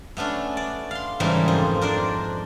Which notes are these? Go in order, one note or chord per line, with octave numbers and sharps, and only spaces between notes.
A3 B3 C#4 D4
D5
F5 C6
G#2 C#3 E3 G3 A3 A#3
F2 C5
D4 A#4 C5 D5